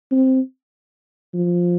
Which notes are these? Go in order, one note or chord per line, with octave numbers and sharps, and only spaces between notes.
C4
F3